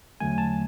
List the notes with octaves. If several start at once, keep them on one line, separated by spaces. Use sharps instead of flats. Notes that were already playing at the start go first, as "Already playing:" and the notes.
E2 D3 F#3 A3 G#5
A5